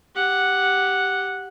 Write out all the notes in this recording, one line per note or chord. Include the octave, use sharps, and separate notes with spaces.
G4 F#5